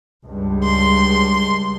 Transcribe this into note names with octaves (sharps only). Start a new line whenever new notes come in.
C#2 G2
C6